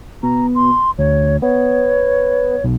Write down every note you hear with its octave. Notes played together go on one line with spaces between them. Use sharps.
B2 A#5
C6
D2 C#5
B3 C#5
B1